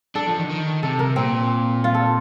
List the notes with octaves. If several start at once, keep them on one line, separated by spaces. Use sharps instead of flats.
D4 A4
F3
D#3
D3
D#3
C3 A4
A#4
A#2 C4
F4
A4